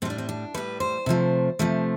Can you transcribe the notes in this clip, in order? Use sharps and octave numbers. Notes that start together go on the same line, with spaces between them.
A2 G3 C4 D4
C4
D4
A2 G3 B4
C5
C3 F3 A3
C3 F3 A3